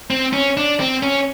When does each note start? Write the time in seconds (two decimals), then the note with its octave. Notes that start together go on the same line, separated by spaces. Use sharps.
0.10 C4
0.33 C#4
0.57 D4
0.80 C4
1.03 C#4